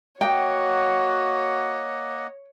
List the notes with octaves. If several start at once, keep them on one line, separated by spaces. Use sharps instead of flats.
A#3 F#4 C#5 D#5 F#5 G5